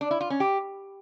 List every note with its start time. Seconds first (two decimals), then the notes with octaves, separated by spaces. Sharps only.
0.01 D4
0.11 E4
0.21 F4
0.30 C#4
0.40 G4